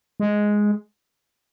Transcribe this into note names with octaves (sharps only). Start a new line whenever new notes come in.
G#3